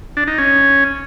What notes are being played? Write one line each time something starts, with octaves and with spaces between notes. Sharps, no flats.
D4
D#4
C#4